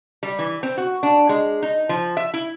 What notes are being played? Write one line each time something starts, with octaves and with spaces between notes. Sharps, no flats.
G3
E3
C4
F#4
D4
G#3
D#4
F3
E5
E4